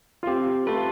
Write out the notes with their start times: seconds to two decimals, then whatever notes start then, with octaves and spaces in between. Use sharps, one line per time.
0.23 F4
0.27 C4 G4
0.67 A3 F4 B4